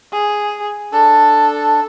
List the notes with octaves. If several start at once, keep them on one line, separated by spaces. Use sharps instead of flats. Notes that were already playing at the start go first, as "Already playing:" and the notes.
G#4
D4 A4